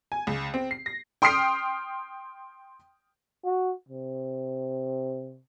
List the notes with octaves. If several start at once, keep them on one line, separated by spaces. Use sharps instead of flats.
G#5
C#2
C4
C7
A#6
G5 C6 D#6 F6 C7 D7
F#4
C3